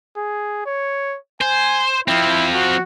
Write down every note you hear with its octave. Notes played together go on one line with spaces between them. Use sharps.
G#4
C#5
C5 G#5
F3 C4 E4
F#4